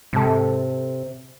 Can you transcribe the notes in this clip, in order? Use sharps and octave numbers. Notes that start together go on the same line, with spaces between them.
G#2 C3 A4